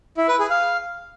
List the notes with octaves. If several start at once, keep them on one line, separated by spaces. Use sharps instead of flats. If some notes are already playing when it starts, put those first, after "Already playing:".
E4
B4
G#4
F5